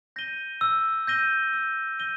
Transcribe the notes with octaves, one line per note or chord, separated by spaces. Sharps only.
G6 A#6 D#7 G7
E6
G6 A#6 D#7 G7
E6
G6 A#6 D#7 G7